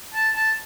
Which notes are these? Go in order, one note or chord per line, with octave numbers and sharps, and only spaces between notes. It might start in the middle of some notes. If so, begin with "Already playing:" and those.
A5
A5